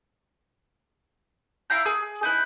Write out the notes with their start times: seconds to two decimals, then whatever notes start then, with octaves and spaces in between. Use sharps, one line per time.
1.70 E4 F5 A#5 G6
1.86 G#4
2.23 D#4 E4 B4